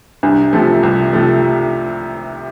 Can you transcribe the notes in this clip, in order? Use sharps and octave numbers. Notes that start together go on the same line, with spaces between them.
C2 D4
C3 F3 A3
C2
C3 F3 A3